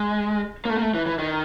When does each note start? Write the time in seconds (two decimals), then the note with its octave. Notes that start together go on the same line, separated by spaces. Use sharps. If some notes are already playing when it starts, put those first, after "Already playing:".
Already playing: G#3
0.65 A#3
0.70 A3
0.77 A#3
0.82 A3
0.94 E3
1.06 E3
1.19 D#3